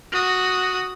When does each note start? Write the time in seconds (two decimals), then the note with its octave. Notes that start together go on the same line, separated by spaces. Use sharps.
0.12 F#4 D#6